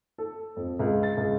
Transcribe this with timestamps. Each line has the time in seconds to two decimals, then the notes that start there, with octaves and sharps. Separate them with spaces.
0.18 A4
0.56 F2
0.79 C#2
1.03 A6
1.17 C#2